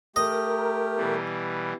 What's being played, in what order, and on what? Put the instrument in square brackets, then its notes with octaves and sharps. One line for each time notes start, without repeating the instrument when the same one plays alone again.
[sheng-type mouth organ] A3 G4 [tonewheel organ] A#4 [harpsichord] D#5
[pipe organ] B2 E3 G3